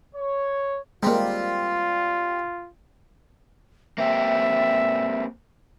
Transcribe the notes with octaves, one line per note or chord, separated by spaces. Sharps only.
C#5
G3 G#3 A#3 C4 F4
A#3 C4 G4 E5